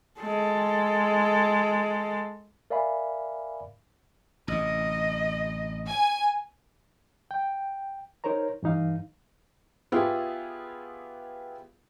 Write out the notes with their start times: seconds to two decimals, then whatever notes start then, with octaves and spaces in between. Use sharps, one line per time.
0.20 G#3 A4
2.70 A#4 D5 E5 F5 G#5 B5
4.48 A1 C3 D#5
5.88 G#5
7.31 G5
8.24 D#4 A#4 C5 C#5 A#5
8.63 G2 E3 D#4 F5
9.92 B3 E4 F4 G4 G#4